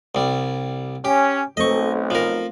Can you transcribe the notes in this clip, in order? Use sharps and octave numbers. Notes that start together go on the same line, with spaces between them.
C2 G3
C#4 G4
B1 A3 C4 D#5 C#6
F3 A#4